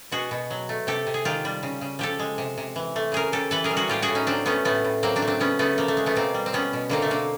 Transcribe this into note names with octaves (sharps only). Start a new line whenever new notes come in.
B2 F#4 G#4
B2
F#3
A3
C3 G4 A4
C3
G#4
D#3 F4 G4
G3
C#3
C#3
F3 G4 A4
G#3
C3
C3
E3
A3
C#3 G#4 A#4
C#3 G4 A4
E3 A4 B4
G#4 A#4
G3
F#4 G#4
A2 F4 G4
F#4 G#4
A2
C#4 D#4
F#3 C4 D4
A3 B3 C#4
A2 A3 B3
A2
F#3 A#3 C4
C4 D4
A3
C4 D4
C#3 B3 C#4
C#3 A3 B3
F3 A#3
A3
G#3
A3 B3
B2 A#3 C4
G3
C4
G3 B3 C#4
B2
D3 A#3 C4
A3
D3 A#3